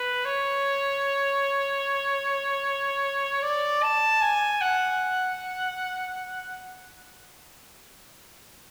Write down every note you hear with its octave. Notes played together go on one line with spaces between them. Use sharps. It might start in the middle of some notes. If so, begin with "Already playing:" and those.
Already playing: B4
C#5
D5
A5
G#5
F#5